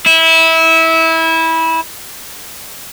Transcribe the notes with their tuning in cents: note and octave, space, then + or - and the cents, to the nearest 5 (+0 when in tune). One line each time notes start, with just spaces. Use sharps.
E4 -20